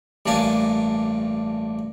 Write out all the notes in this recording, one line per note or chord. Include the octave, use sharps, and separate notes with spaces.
A1 G2 A#3 D4 F5 G#5